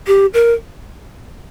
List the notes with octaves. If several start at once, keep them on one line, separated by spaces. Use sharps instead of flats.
G4
A#4